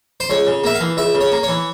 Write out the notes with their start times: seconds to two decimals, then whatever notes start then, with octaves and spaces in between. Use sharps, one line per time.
0.20 C5
0.30 C#2 C#5
0.47 C#3
0.64 A#3 E5
0.75 F5
0.80 E3
0.97 C#2 E5
1.15 C#3
1.21 C#5
1.32 A#3
1.43 C#5
1.48 E3